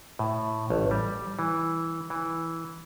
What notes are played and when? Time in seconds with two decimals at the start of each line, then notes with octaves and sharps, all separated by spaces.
0.19 A2
0.70 A1
0.91 G3
1.39 E3
2.10 E3